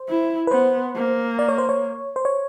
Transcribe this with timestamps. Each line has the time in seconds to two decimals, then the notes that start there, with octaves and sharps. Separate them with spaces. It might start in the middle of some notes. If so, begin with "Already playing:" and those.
Already playing: C5
0.09 E4
0.47 B4
0.51 B3 C5
0.95 A#3
1.39 D5
1.49 C#5
1.58 C5
1.69 C#5
2.16 C5
2.25 C#5